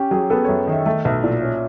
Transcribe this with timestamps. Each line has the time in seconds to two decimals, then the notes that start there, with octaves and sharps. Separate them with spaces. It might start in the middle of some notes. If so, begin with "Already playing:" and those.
Already playing: C#4 G4
0.11 F#3 G#4
0.30 B3 A4
0.45 F#2 C#5
0.67 D#3 E5
0.86 A3 E5
1.05 B1 E5
1.23 A#2 D5
1.42 C#4